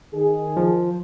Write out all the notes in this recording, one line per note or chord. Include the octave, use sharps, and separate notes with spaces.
D#3 G#4
F3